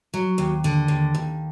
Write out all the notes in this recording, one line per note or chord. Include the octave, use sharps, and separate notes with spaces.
F#3
D#2
D3
D#2
D#2